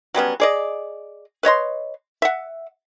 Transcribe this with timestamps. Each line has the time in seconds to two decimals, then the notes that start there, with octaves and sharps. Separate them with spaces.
0.14 F#3 G3 B3 C#4
0.40 G#4 D5 D#5
1.43 B4 C#5 D#5 C6
2.22 E5 F#5